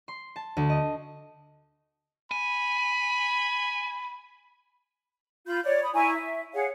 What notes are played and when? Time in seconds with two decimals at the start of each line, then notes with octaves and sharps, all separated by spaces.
0.08 C6
0.36 A5
0.57 D2
0.70 D#5
2.31 G#5 B5
5.46 F4 B5 G6
5.64 C#5 D5
5.82 B5 D#6
5.94 E4 G#5 A#5 C#6
6.14 E5
6.54 G#4 C#5 F5 F#5